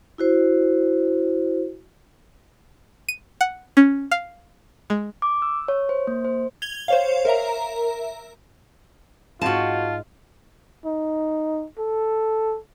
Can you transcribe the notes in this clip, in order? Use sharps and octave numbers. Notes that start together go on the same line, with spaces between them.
E4 F#4 C5
D#7
F#5
C#4
F5
G#3
D6
E6
C#5
C5
A#3
C5
G#6 F7 G7
C5 C#5 F5
A#4 E5 A#5
G#2 C4 D#4 F4 F#4 A5 D#7
D#4
A4